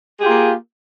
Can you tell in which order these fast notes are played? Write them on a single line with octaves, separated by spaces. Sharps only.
G#4 G4 F4 A#3